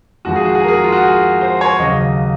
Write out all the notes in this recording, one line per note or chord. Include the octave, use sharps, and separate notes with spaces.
F2 D#3 G#3 F#4
G#4
F#4
G#4
A#4
G#4
F#4
F4
F#4
G#4
C5
C#5
D#2 C#3 F#3 D#5